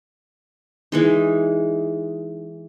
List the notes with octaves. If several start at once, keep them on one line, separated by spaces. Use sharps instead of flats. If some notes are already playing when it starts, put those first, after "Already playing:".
E3 G#3 D#4